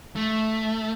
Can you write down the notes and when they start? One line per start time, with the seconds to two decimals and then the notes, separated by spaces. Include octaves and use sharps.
0.16 A3